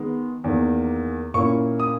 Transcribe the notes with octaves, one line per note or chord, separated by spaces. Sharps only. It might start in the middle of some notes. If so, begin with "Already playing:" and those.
Already playing: D#3 G#3 B3
E2 D#3 A#3
A#2 A#3 C#4 E4 C#6
D#6